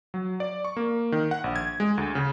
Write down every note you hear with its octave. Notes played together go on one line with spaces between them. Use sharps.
F#3
D5
C#6
A#3
D#3
F#5
A#1
G#6
G#3
D2
C#3